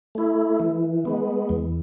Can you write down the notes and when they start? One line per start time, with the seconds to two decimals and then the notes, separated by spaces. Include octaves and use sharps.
0.15 A3 E4
0.60 E3
1.05 G#3 B3
1.49 E2